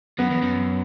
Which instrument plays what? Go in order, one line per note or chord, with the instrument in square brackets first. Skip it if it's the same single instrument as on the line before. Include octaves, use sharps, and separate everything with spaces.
[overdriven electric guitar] F#2 [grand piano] B3
[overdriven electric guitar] E2
F#2